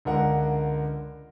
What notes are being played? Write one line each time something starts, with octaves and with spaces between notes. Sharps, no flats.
C#2 D3 A#4 F#5